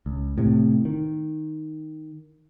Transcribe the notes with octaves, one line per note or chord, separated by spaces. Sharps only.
C#2
A2 C3
D#3